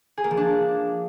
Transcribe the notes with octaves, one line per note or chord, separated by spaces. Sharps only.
G#4
A#3
F3
D4